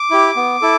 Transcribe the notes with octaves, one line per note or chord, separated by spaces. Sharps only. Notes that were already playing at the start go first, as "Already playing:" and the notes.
Already playing: D6
E4 G4
B3
E4 A4